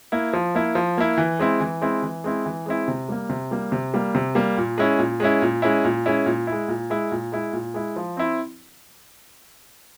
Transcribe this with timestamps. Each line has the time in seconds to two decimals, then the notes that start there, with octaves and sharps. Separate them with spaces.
0.12 A#3 E4
0.33 F3
0.55 A#3 E4
0.75 F3
0.98 A#3 E4
1.18 E3
1.39 G#3 C4 E4
1.60 E3
1.81 G#3 C4 E4
2.02 E3
2.24 G#3 C4 E4
2.46 E3
2.66 G#3 C4 E4
2.88 C3
3.09 G3 A#3
3.30 C3
3.51 G3 A#3
3.72 C3
3.94 G3 A#3
4.15 C3
4.35 G3 A#3
4.58 A#2
4.78 G#3 C#4 E4
4.99 A#2
5.20 G#3 C#4 E4
5.42 A#2
5.62 G#3 C#4 E4
5.85 A#2
6.06 G#3 C#4 E4
6.26 A#2
6.47 E4
6.52 G#3
6.68 A#2
6.90 G#3 E4
7.11 A#2
7.32 G#3 E4
7.53 A#2
7.74 G#3 E4
7.96 F3
8.17 C4 E4